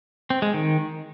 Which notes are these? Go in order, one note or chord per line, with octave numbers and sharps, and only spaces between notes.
C4
G#3
D#3